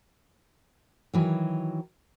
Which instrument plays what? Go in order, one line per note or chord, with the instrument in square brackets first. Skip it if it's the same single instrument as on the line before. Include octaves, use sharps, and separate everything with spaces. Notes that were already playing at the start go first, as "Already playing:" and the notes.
[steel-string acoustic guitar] D#3 E3 F#3